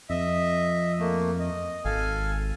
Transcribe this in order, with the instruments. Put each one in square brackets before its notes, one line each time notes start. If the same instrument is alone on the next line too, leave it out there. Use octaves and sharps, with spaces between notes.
[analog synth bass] F2 [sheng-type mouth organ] D#5 E5
[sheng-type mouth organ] A3 A#3
D#5
[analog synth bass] G#1 [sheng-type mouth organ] A4 F5 G#5